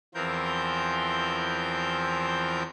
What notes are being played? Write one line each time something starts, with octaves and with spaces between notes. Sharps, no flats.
E2 E3 F3 C4 A#4 G6